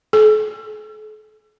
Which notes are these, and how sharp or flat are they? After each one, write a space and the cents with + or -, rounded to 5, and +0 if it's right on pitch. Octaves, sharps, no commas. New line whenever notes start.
A4 -40